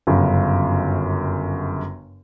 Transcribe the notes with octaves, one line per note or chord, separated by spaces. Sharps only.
G1 F#2 C#3